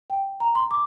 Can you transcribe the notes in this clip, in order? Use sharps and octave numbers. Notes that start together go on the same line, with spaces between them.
G5
A#5
C6
D6